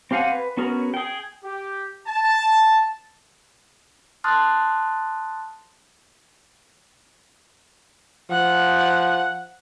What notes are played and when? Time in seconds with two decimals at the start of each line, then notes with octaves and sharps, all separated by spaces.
0.11 C4 G4 F5 F#5 G#5
0.32 B4
0.57 B3 C#4 F#4 G#4 A#4
0.94 G#4 G5
1.44 G4
2.07 A5
4.24 A5 C6 D#6 F6 F#6 A6
8.30 F3 F#5